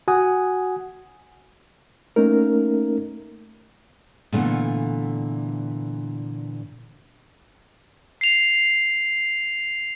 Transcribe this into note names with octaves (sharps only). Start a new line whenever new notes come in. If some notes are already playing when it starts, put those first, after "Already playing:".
F#4 F#5 G#5 D#6
A3 A#3 C#4 D#4 A#4
A#2 D3 E3 A3 B3
C7 F7